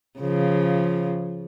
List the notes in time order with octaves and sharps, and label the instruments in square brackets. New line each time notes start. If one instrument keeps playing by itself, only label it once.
[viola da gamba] C#3 F3